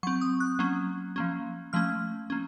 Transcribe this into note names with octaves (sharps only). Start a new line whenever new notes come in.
F#3 C4 C#6
D#6
F#6
F#3 A#3 C#4
F3 A#3 C#4
F3 A3 C#4 F6
A#3 C#4